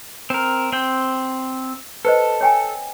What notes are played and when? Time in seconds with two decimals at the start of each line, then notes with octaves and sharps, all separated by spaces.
0.30 C4 A#4
0.72 C4 G5
2.05 A4 B4 C5 D#5
2.41 C#5 G5 G#5